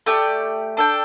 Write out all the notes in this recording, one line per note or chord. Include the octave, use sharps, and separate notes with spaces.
A3 G4 D5 G5
D4 A4 G5